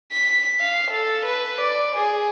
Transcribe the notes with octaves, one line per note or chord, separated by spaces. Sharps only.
B6
F5
A4
B4
D5
G#4